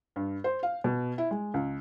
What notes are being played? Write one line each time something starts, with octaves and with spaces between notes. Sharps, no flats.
G2
C5
F5
B2
E4
G#3
C#2